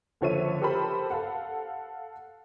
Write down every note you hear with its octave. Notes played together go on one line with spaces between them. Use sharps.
F#1 D3 F3 C#5 E5 D#7
G4 A4 A#4 C5 B5
A4 F5 F#5